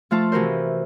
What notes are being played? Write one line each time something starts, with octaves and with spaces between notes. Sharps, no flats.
F3 A3 F4 A5
C3 E3 F#4 A#4 C5